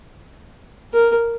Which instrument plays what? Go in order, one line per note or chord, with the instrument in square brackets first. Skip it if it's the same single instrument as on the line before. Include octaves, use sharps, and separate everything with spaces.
[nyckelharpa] A#4